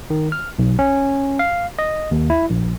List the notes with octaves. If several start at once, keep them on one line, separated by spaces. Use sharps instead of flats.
D#3
F6
B1
C#4
F5
D#5
D#2
E4
A#1